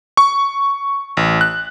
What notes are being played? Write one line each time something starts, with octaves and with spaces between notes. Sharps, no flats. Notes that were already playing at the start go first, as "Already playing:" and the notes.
C#6
A1
F#6